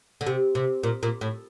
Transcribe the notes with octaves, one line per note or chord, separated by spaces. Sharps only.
D3
C3
C3
A#2
A#2
A2